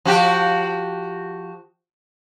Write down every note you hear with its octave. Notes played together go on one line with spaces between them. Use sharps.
F3 F#4 G4